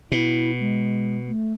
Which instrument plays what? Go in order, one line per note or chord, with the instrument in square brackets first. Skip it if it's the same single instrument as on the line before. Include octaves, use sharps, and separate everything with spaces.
[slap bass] B2 [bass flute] E4
[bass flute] G#3
A3